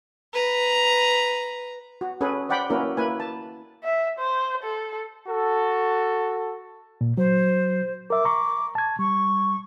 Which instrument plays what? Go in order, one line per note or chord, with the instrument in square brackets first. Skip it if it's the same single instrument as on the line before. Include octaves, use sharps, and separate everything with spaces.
[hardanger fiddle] B4 A#5
[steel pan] F#4
C#4 G#4 A4 B4 G#5
C5 D5 F#5 G5 B5
A#3 C#4 E4 F#4 A#4 B4
A#3 E4 B4 G#5
A5
[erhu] E5
C5
A4
[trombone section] F#4 A4
[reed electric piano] A#2
[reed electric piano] F#3 [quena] C5
[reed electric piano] A#4 E5 [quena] D6
[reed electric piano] A#5 C#6
A5 G#6
[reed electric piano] G3 [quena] C#6